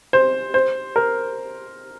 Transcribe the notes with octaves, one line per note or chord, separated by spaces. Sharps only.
C5
C5
A#4